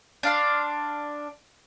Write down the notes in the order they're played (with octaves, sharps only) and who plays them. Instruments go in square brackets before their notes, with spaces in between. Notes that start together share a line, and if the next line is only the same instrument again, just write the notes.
[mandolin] D4 F5 C6